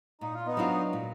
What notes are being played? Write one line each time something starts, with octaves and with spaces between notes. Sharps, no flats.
A#2 D#4
F4
B3 D#4
F#3 D4 F4
A#2